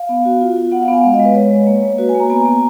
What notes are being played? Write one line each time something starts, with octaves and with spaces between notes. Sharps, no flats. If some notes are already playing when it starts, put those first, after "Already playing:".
Already playing: F5
B3
F#4
F4
F4
B3 F#5
F5
B3 G#5
G#3 F5
D#5
G#3
B4
G#3 C#5
G#3
A#3
A#3
F#4 B4
G#5
A#3
A#5
B3 G#5
G#5
B3 A#5